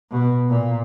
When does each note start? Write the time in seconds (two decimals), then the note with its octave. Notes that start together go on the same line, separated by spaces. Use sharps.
0.11 B2
0.49 A#2